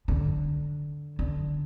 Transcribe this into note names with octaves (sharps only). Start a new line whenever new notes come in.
D3
D3